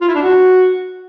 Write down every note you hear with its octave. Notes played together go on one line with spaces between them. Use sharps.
F4
E4
D4
F#4